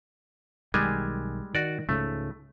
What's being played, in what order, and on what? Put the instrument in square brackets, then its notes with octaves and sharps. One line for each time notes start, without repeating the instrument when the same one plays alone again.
[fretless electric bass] B1 D#3 [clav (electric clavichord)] G3 G#3 G#5
[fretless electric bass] D#3 [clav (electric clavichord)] F#4 D5
[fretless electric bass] C#2 G#2 C#3 [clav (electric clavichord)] A3